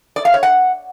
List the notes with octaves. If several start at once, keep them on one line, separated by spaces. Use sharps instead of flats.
D5
F5
C#5
F#5